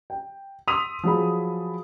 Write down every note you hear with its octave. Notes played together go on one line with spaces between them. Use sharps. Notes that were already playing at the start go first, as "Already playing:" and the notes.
G5
C6 D#6 E6 B6 D#7 F7
F3 F#3 G#4 B5